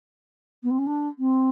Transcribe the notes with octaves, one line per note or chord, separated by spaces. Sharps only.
B3
C4
C#4
D4
C4